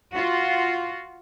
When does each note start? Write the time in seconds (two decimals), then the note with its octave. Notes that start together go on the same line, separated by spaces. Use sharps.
0.13 F4 F#4